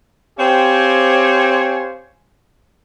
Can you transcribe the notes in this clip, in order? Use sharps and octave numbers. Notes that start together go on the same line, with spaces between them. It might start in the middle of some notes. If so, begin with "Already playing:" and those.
C4 G4 C5 C#5 F5 G#5